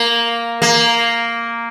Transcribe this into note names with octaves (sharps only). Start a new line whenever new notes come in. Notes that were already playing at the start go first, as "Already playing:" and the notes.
Already playing: A#3
A#3